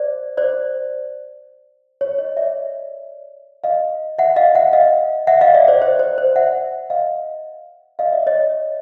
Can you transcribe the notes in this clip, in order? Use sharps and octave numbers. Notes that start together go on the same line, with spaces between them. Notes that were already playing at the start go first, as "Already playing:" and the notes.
Already playing: C5 D5
C5 D5
C#5
C#5 D#5
D5 E5
D#5 F5
E5 F#5
D#5 F5
E5 F#5
D#5 F5
E5 F#5
D#5 F5
D5 E5
C5 D5
C5
C5
C5
E5 F#5
D#5 F5
D#5 F5
D5 E5
C#5 D#5